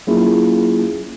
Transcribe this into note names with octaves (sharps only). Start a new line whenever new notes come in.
F#3 A#3 C#4 E4 F4 G#4